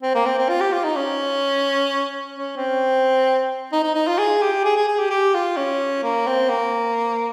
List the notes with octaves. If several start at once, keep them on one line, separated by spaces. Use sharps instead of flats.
C4
A#3
C4
C4
F4
G4
F4
D#4
C#4
C#4
C4
D#4
D#4
D#4
F4
G#4
G4
G#4
G#4
G#4
G4
G4
F4
C#4
A#3
C4
A#3